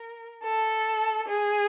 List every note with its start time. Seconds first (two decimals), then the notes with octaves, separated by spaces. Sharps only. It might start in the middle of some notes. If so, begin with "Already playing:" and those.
Already playing: A#4
0.44 A4
1.28 G#4